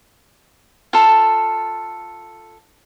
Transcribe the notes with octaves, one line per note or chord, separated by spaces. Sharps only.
F4 A4